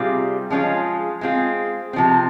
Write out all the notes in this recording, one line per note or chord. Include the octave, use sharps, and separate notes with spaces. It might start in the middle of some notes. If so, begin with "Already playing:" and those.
Already playing: C3 G3 C4 F4 G#4
F3 G#3 C#4 F4 G#4
G#3 C4 F4 G#4
C3 F3 C4